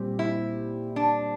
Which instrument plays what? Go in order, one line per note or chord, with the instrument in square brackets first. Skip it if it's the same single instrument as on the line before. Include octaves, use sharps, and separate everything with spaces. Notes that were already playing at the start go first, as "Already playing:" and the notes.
Already playing: [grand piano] A#2 G3 C4 G4
[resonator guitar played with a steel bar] E4
D4